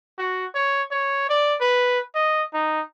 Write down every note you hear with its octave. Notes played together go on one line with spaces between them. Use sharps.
F#4
C#5
C#5
D5
B4
D#5
D#4